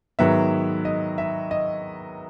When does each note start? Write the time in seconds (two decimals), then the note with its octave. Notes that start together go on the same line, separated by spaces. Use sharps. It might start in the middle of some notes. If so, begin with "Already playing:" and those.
0.19 G#2 D#3 F#3 B3 E5
0.85 D#5
1.18 E5
1.51 D#5